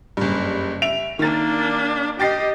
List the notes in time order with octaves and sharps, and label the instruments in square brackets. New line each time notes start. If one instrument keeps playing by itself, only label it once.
[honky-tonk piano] F#1 G2
E5 D7 F7
[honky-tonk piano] D#3 A6 [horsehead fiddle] A#3 D4
[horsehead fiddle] G4 D#5 [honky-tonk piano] G5 A6 C7